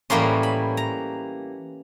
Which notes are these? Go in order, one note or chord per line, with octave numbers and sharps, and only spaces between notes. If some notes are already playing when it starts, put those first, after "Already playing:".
A2 E3 G3 A#3 C#4 C6
B5
A#5